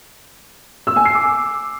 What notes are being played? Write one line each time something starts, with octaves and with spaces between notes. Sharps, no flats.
E6
G#5
C7
D6